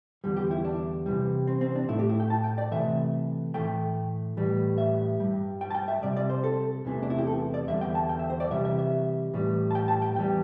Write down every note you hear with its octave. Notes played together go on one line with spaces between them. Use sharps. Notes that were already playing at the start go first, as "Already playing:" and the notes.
E2 D3 G3
G4
E4
D4
C3 E3 G3
C4
C4
D4
A2 A3 E4
G4
E4
G5
A5
G5
D5
C3 E3 A3 E5
A2 E3 A3 G5
A2 E3 G3
E5
G2 G3
G5
A5
G5
E5
C3 G3 D5
D5
C5
A4
E2 C3 E3 A3
D4
E4
G4
A4
D5
E2 D3 G3 E5
G5
A5
G5
E5
C5
D5
C3 E3 G3 E5
E5
E5
A2 E3 G3
A5
G5
A5
G5
E2 E3 G3 G5